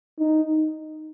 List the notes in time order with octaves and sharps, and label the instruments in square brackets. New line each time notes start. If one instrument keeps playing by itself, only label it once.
[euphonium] D#4